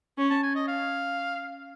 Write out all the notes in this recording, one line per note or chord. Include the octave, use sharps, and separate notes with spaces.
C#4
A5
G#5
D#5
F5